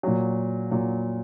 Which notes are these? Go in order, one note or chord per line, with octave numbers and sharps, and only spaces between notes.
A#2 F#3
A#2 F#3